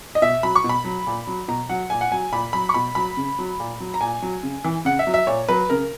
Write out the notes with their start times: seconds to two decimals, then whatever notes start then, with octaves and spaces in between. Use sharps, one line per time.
0.15 D#5
0.22 B2 E5
0.43 F#3 B5
0.56 C#6
0.64 B2
0.69 B5
0.85 F#3
1.07 A#2
1.27 F#3
1.48 B2 A#5
1.69 F#3 F#5
1.90 A#2 G#5
2.01 F#5
2.12 F#3 G#5
2.32 A#2 B5
2.53 F#3 B5
2.69 C#6
2.74 B2 B5
2.95 F#3 B5
3.17 C#3
3.39 F#3
3.60 A#2
3.80 F#3
3.94 A#5
4.01 A#2 G#5
4.22 F#3
4.43 C#3
4.64 E3
4.85 C#3 F#5
4.99 E5
5.07 F#3
5.14 E5
5.27 A#2 C#5
5.49 F#3 B4
5.69 C#3 A#4